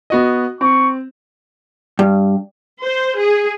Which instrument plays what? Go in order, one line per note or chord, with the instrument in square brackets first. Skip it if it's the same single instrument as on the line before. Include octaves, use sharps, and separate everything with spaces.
[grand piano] B3 F#4 D#5
[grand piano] C4 [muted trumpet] C#6
[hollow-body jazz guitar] G2
[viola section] C5
G#4